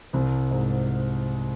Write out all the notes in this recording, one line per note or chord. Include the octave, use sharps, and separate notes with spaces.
C2 C3
G#2